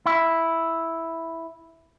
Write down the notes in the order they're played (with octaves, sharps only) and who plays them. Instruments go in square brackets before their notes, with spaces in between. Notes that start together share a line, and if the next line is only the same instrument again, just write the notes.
[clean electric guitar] E4 E5